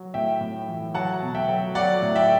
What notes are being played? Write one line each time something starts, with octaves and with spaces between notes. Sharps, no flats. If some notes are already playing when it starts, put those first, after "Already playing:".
Already playing: F#3
A2 E5 G5
A2
E3
F#3 F#5 A5
B2
E5 G5
F#3
F#3 D5 F#5
A2
E5 G5